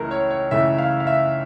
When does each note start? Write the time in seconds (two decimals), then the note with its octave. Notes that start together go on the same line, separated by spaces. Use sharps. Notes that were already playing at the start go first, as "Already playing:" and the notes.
Already playing: C#2 C#3 E3 A3 A4 A#4
0.11 C#5
0.30 C#5
0.51 C#2 C#3 E3 A3 E5
0.78 F5
1.00 F5
1.07 E5